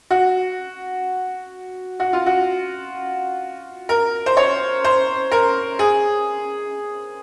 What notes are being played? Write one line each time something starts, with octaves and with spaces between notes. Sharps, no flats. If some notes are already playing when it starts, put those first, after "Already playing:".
F#4
F#4
F4
F#4
A#4
C5
C#5
C5
A#4
G#4